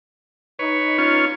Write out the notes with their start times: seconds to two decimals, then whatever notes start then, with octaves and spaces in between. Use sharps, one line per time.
0.59 D#4 B4 C#5
0.98 C#4 F4 C#5